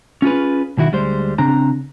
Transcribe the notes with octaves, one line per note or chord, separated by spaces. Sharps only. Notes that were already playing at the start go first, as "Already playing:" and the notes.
C#4 F4 G#4 B4
B1 D#3 E4 F#4
D2 G3 G#3 C5
C#3 C4 D4 A#5